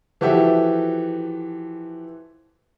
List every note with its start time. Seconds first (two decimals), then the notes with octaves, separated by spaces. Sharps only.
0.21 E3 F3 F#4 G4 A4 E5